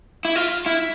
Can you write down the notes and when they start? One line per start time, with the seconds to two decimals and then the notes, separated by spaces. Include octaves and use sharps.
0.25 E4
0.36 F4
0.66 E4